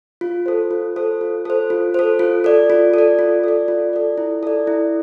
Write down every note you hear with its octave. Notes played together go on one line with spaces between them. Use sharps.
F4
A4 C5
F4
A4 C5
F4
A4 C5
F4
A4 C5
F4
A4 D5
F4
A4 D5
F4
A4 D5
F4
A4 D5
E4
A4 D5
E4